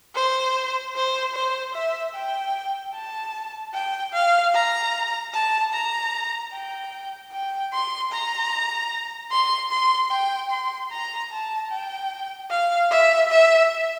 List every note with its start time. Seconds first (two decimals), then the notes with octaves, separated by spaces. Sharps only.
0.15 C5
0.95 C5
1.35 C5
1.75 E5
2.14 G5
2.95 A5
3.74 G5
4.14 F5
4.54 A#5
5.34 A5
5.73 A#5
6.53 G5
7.32 G5
7.73 C6
8.12 A#5
9.31 C6
9.72 C6
10.11 G5
10.51 C6
10.91 A#5
11.32 A5
11.71 G5
12.51 F5
12.91 E5
13.31 E5